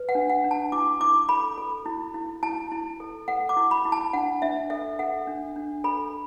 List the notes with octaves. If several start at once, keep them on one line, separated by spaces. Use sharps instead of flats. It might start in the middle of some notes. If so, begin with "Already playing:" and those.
Already playing: B4
F#5
D4
F#5
D4
A5
E4 D6
E4 D6
A4 B5
A4
E4
E4
E4 A5
E4
A4
A4 F#5
D6
E4
B5
E4
A5
D4 F#5
D4 E5
A4 E5
A4 F#5
D4
D4
A4 B5